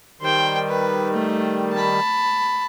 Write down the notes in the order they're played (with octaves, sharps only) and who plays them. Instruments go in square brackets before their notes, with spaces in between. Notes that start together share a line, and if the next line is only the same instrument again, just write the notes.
[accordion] D#3 G3 [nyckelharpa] C5 G5
[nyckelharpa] B4
A3
A5 B5